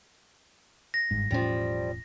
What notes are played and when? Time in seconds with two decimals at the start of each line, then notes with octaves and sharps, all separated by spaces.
0.94 A#6
1.11 G1 G#2
1.31 E1 A2 F3 G3 C#4